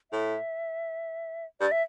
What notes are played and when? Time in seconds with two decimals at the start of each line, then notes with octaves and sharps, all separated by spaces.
0.11 A2 E5
1.60 G2 D5
1.72 E5